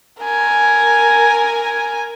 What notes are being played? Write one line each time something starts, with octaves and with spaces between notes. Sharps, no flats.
A#4 G#5